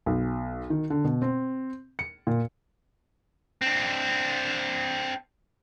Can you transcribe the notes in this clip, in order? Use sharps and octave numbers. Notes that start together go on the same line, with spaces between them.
B1
D#3
D3
B2
C4
C#7
A#2
C4 D4